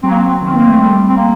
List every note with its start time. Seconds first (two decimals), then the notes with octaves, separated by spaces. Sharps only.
0.03 F#3 C4
0.11 A#3
0.19 C4
0.41 D#3 C4
0.54 A#3
0.67 A3
0.79 G3
1.09 C4
1.17 A#3